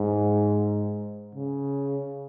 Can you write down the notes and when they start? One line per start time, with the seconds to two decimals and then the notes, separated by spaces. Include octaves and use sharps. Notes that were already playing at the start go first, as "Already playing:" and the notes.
Already playing: G#2
1.35 C#3